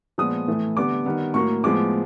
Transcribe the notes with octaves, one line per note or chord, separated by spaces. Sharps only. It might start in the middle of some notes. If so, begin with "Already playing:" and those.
A#2 F3 G#3 B3 D#6
A2 E3 A3
D3 G3 B3 D6
D#3 G3 B3
A2 F#3 A#3 C#6
A2 F3 G#3 B3 D6